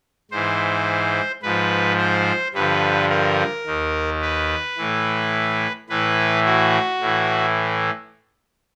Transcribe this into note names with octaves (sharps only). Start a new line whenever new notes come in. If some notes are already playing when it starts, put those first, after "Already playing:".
G#2 E3 C5
G#2 F3 B4
C5
G2 D3 F3 B4
A#4
D#2 D#3
B4
A2 E3
A2 E3 B4
F#4
A2 E3